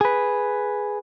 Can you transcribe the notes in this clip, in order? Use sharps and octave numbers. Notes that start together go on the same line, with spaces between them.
G#4 B4